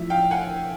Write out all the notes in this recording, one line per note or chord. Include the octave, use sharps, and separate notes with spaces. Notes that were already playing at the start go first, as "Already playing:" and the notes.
Already playing: A2 F3 E5
F5 G5
F#5 G#5